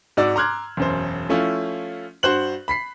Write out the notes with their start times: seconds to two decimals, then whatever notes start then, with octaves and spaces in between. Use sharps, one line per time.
0.17 G#2 F#4 D5 E6
0.36 A#5 C6 D6 F6 F#6 G#6
0.77 E1 F#2 C5
1.29 F3 A3 C#4 E4 F4
2.23 G2 F#4 C5 F#6 F#7
2.68 B5 B6 C7